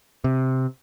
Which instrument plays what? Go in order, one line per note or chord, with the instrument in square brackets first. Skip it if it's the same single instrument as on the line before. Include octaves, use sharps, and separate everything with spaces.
[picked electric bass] C3